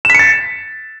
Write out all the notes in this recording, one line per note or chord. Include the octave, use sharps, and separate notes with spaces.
A6 B6 C#7 E7